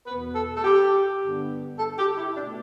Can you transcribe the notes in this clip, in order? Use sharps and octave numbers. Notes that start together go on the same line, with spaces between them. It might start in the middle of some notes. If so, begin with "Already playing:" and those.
E2 B2 B3 B4
A4
A4
G4
G2 D3 B3
A4
G4
E4
B2 A3 D4